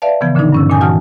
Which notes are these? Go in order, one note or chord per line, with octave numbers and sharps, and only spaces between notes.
B4 D5 E5 F5 A5
C#3 E3 F3 B3
A#2 D3 F3 D4 D#4
G2 C#4 E6
A#2 D#3 C#4 G#5 D#6 G6
E3 F#4 F#5 A5 D#6 F6